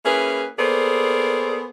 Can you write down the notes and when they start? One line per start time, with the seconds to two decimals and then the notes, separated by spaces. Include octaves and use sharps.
0.05 A#3 C#4 E4 G#4 B4
0.57 A#3 B3 G#4 A4 C5 D5